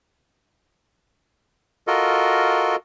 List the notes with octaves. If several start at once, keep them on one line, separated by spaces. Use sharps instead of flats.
F4 F#4 A4 A#4 D#5